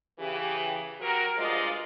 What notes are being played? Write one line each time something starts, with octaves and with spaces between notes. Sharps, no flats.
C#3 E3 G4
F#3 F#4 G4 A#4
G2 F3 G#3 F4 D5 D#5